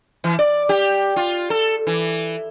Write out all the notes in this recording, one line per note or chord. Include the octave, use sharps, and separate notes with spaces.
E3
D5
G4
F4
A4
E3